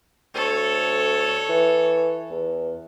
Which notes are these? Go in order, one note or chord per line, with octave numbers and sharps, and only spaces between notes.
D2 A4 C#5
E3
E2